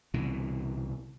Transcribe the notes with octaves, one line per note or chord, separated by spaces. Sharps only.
C2 B2 D3 E3